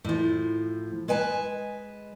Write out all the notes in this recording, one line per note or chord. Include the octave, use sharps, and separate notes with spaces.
A2 F3
G#3 B4 G#5 A5